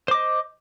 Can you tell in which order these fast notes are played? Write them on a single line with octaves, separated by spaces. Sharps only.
C5 D6 D#5